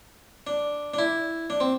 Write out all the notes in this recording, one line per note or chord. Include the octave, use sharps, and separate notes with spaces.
D4
D4
E4
D4
C4